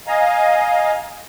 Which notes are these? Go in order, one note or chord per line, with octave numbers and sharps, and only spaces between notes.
D#5 F5 G#5 A#5